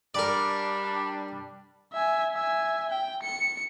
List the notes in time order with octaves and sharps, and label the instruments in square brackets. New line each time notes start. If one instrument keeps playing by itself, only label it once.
[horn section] G3 D4 [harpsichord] A#4 D5
[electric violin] E5 G#5
E5 G#5
G5
C#7